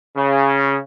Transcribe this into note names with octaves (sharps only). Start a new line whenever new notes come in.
C#3